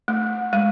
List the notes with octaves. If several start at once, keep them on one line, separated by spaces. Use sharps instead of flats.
A3
G#3